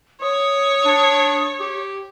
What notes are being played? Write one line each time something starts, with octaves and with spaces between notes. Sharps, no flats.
C#5 D#6
D4
G4